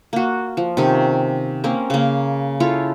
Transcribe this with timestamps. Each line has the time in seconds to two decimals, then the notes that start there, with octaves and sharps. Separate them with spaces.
0.13 A#3 F#4
0.57 F3
0.77 C3 D#3 C#4 G4
1.64 A#3 C4 C#4 A#4
1.90 C#3 A#3
2.60 E4 F4 A4 C#5